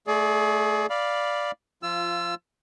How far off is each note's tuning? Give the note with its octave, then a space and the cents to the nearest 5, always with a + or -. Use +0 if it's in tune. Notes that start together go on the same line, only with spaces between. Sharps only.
A3 -5 G#4 +30 D5 +0
D5 +0 F5 +0 B5 -10
F3 +0 F4 -15 E6 +25